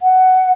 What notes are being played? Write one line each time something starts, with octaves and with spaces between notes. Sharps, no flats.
F#5